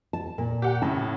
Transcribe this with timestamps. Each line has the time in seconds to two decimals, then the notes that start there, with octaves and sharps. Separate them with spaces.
0.13 A5
0.38 A#2
0.62 G4 F#5 G5
0.82 A2 C#3 A5